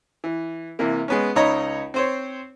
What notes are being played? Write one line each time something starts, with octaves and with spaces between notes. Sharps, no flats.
E3
C3 E3 A#3
G#3 B3 C#4
C#2 D#4 C#5 D#5 A#5 B5
C4 C5 C#5